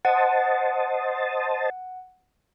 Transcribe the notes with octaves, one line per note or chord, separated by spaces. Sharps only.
C5 D#5 F#5 A5